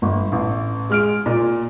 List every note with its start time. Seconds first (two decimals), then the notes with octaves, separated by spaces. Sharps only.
0.02 G1
0.32 A1
0.90 G#3 F6 D7
1.26 A#2